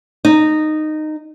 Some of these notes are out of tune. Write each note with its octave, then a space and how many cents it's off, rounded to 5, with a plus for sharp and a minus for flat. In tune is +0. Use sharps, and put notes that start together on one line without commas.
D#4 -15